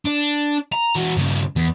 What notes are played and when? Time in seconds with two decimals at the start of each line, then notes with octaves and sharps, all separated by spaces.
0.05 D4
0.72 A#5
0.95 E3 F#4
1.17 G2 C#3
1.56 E2